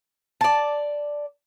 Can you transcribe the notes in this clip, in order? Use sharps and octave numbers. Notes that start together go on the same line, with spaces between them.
D5 A5